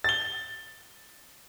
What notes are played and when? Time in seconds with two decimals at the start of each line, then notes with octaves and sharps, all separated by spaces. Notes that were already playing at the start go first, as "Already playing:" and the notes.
0.04 A6 G7